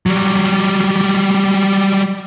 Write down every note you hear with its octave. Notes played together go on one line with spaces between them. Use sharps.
F#3 G3